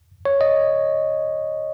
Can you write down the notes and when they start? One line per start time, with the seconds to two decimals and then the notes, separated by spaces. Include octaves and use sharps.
0.25 C#5
0.41 D#5